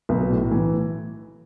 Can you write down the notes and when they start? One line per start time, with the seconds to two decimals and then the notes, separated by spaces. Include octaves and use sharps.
0.09 B1
0.30 A2
0.51 E3